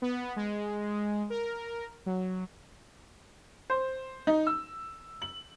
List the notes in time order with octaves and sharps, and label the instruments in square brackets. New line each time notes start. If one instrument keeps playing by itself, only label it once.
[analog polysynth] B3
G#3
A#4
F#3
[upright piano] C5
D#4
E6
F#7